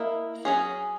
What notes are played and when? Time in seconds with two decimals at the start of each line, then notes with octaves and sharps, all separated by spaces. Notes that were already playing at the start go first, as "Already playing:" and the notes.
Already playing: A#3 E4 A#4 D#5
0.45 F#3 C#4 G#4